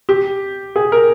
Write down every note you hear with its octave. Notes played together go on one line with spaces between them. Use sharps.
G4
G#4
A#4